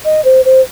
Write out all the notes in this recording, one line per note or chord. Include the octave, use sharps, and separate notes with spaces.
D#5
C5
C5